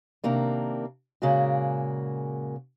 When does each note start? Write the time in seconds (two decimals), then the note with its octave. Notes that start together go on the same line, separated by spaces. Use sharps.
0.24 C3 D#3 A#3 D4
1.22 A#2 C#3 G#3 A#3 F#4